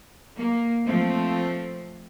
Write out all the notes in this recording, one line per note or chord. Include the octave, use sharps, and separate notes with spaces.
A#3
F3 A3 C4